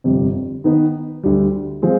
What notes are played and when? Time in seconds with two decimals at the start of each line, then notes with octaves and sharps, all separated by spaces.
0.04 G1 F2 C3 G3
0.64 D#3 B3 D#4 B4
1.23 D2 D3 G3
1.82 F3 G#3 C4